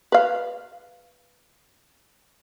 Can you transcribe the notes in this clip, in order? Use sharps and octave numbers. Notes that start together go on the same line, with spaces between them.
B4 F5